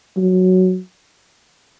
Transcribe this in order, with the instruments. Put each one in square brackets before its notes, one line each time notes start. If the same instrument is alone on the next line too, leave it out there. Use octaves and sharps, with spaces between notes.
[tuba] F#3